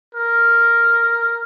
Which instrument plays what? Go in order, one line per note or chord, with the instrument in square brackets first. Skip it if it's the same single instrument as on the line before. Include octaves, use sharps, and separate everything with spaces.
[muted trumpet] A#4